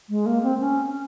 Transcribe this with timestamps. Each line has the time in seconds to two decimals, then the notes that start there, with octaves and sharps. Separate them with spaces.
0.10 G#3
0.26 A#3
0.43 C4
0.60 C#4